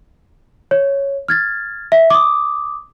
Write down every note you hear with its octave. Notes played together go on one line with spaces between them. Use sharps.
C#5
F6 G#6 A6
E5
D6 D#6